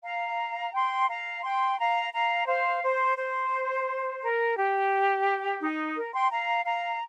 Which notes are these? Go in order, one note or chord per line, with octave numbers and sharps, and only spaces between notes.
F5 A#5
G5 C6
F5 A#5
G5 C6
F5 A#5
F5 A#5
C5 F5
C5
C5
A#4
G4
D#4
A#4
G5 C6
F5 A#5
F5 A#5